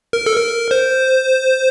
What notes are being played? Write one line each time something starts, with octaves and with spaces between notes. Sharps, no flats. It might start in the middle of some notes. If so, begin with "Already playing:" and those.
A#4
A4
A#4
C5